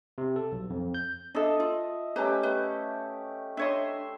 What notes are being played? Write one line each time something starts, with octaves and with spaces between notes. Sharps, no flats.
C3
A4
B1
F2
G6
D4 A4 D#5 E5 A5
F4
A3 C#4 G4 B4 A#5
B4
D4 C#5 D#5 E5 C6